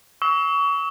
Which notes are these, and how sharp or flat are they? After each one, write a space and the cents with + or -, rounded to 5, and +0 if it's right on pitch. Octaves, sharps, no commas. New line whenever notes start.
C#6 +30 E6 -40